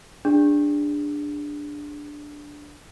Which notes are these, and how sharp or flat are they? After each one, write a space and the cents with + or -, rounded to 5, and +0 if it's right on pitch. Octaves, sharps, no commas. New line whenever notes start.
D4 +0 G#4 -35